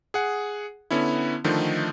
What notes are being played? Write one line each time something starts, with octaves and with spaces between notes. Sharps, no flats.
G#4 F#5
D3 B3 C#4 E4
D3 D#3 F3 A3 D#4